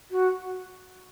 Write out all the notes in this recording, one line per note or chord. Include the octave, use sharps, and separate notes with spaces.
F#4